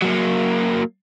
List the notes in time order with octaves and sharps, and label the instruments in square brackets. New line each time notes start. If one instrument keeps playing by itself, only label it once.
[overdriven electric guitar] F#3 A#3